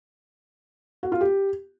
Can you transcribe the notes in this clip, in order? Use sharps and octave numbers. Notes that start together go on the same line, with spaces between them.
F#4
F4
G4